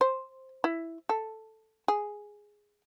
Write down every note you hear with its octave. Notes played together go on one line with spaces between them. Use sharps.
C5
E4
A4
G#4